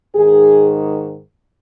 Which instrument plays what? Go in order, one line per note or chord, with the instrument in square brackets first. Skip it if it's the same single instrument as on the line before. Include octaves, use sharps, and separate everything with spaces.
[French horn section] G#2 D#3 G#4